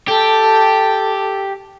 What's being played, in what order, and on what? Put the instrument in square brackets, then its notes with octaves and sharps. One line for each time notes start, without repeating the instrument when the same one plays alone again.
[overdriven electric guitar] G4 [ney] A4